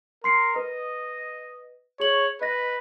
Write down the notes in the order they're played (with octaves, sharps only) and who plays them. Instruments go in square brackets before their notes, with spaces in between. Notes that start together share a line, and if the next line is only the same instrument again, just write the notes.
[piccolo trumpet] A#4 [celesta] C6 C7 C#7
[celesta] B4 [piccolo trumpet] D#5
[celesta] G#4 C#6 F#7 [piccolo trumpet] C#5
[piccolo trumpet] B4 [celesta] D#5 A#6